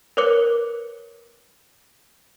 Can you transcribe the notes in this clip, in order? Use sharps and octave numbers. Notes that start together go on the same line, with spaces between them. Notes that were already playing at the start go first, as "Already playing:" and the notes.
A#4 B4 C#5 D6 F#6 C#7